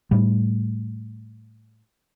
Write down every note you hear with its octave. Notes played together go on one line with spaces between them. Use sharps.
A2 G3